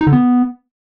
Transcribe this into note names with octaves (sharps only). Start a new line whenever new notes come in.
D#4
D3
B3